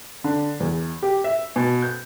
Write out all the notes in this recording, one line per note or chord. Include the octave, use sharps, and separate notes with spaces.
D3
E2
G4
E5
B2
G6